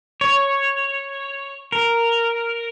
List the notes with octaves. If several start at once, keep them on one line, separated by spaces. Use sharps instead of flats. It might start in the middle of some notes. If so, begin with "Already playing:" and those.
C#5
A#4